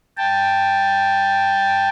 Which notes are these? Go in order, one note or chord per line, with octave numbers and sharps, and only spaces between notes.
G5 A5